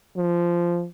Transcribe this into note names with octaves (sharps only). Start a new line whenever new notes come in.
F3